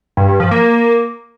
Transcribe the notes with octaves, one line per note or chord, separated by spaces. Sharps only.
G2
G2
F3
A#3